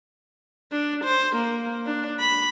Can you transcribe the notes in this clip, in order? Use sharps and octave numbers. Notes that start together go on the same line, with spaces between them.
D4
C5
A#3
D4
B5